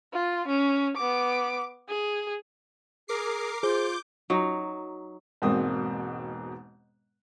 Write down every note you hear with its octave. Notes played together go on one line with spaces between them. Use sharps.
F4
C#4
B3 D6
G#4
G#4 A#4 D6 C7
F4 G#4 C5 D6 G6
F#3 D#4
E1 G#2 B2 A#3 C4 D#6